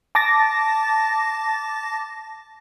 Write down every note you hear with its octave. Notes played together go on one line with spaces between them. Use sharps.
A5 D6 A6 A#6